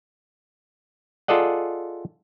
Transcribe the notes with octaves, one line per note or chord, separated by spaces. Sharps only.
F4 G#4 A4 D5 D#5 F#5